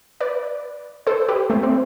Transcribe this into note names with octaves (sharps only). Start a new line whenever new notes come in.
B4 D5
A4 C5
G4 B4
A3 C4
C4